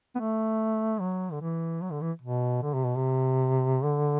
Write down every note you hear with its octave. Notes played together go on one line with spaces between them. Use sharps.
B3
A3
F#3
D3
E3
F#3
D3
E3
B2
D3
C3
B2
C3
D3